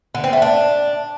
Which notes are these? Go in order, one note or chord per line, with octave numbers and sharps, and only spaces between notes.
D3
C4
A3
D4